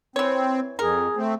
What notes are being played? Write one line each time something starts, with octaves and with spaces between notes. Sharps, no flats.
E3 C4 C#5
F2 G#4 A#4
A3 C4